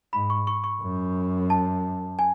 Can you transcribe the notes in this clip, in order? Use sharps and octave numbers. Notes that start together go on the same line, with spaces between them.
G#2 B5
C#6
C#6
C#6
F#2
A5
G#5